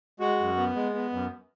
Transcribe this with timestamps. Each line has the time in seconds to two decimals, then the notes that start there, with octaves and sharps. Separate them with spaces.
0.20 G#3 F#4
0.39 F#2
0.57 B3
0.75 G#3
0.94 B3
1.12 F#2